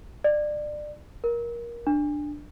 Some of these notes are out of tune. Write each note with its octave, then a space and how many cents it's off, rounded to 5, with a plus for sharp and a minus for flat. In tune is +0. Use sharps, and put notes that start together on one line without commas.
D5 +25
A#4 +20
D4 +10